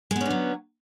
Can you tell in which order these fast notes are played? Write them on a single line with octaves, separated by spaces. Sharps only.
G#3 B3 C#4 D3 F#3